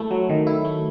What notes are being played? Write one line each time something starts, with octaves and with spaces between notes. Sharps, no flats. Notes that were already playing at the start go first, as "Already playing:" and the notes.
Already playing: A3 E4
F#3
D#3
E4
A3